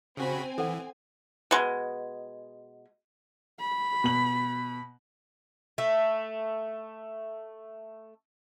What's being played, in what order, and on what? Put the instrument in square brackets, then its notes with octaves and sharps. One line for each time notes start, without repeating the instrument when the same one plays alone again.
[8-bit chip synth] C#3 F#4 B5 [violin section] C4 G#5
[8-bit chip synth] E3 [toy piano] A4 F#5
[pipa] B2 G#3
[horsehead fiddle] B5
[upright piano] B2 F#7
[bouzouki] A3 E5